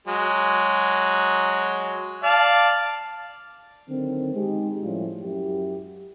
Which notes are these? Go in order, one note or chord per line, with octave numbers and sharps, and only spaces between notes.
F#3 G#3
D5 F5 A5
D3 D#3 F#3 C4
G#3 D#4 G4
A2 F3 G3 C#4 E4 F4
F#2 E4 F#4 G4